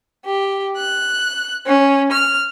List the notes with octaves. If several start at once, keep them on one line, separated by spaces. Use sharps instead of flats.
G4
F#6
C#4
F6